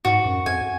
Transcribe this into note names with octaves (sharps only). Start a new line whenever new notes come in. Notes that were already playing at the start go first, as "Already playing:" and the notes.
G#2 F#4
F#2
F2 G#5